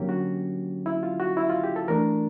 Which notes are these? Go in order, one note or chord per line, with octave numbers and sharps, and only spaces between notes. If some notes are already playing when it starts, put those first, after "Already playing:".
Already playing: D3 F#3 A#3 C#4 G4
F#4
E4
F4
F#4
E4
F4
G4
A4
E3 A3 D4 A#4